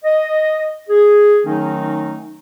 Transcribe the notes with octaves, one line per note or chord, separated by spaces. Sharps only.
D#5
G#4
D#3 F#3 A3 C#4 D#4